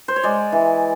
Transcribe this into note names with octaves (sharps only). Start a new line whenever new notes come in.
C5
C#5
G#3 D5
E3